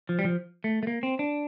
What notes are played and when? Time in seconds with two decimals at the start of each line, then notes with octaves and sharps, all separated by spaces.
0.09 F3
0.19 G3
0.25 F3
0.64 A3
0.83 A3
0.87 A#3
1.03 C4
1.19 D4